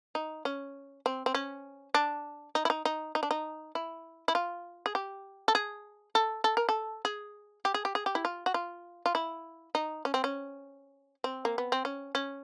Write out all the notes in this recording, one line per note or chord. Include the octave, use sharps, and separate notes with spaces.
D#4
C#4
C4
C4
C#4
D4
D#4
E4
D#4
D#4
D#4
D4
D#4
E4
E4
F4
G#4
G4
A4
G#4
A4
A4
A#4
A4
G#4
G4
G#4
G4
G#4
G4
E4
F4
F#4
F4
F4
E4
D#4
C#4
C4
C#4
C4
A#3
B3
C4
C#4
C#4